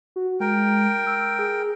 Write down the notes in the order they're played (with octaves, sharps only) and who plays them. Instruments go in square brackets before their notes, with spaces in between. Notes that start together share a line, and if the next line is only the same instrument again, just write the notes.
[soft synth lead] F#4
[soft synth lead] G#3 [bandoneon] A#4 G5
[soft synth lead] E6
G#4